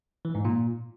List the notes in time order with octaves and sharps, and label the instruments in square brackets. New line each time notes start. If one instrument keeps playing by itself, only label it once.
[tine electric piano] E3
G#2
A#2